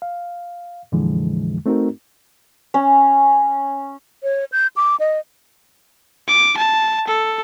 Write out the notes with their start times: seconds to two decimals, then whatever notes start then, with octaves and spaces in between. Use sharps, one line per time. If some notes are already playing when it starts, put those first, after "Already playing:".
0.02 F5
0.92 F2 A#2 D3 E3 F3 G#3
1.66 A3 C4 D#4 F#4 A#4
2.74 C#4
4.23 C#5
4.52 G6
4.76 D6
5.00 D#5
6.28 D6
6.57 A5
7.07 A4